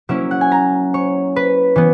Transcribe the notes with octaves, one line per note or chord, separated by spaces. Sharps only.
F#3 A#3 C#4 E4 E5
F#5
G#5
A#5
C#5
B4
E3 B3